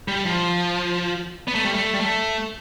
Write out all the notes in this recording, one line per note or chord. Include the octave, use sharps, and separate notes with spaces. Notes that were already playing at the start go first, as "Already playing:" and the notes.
G3
F3
B3
A3
G3
A3
G3
A3